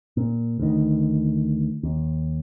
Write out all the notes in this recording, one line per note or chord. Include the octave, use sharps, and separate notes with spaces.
A#2
D2 D#3
D#2